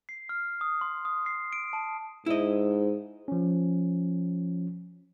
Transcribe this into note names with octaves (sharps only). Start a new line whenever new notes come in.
C7
F6
D#6
C6
D#6
C7
D7
A5
G#2 E4 D#5
F3 C#4